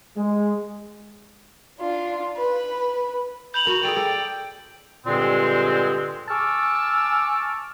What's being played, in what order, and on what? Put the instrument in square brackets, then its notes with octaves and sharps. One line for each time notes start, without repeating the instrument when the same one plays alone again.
[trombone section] G#3
[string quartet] D4 F4
B4
[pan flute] B5 [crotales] G6 F7 F#7
[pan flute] F#4 [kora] A#4
[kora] G#4 A4 D5 [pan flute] G5
[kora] A4 D5
[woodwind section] G2 A#2 D3 G#3 C4
G#5 A5 C#6 D6 E6 F6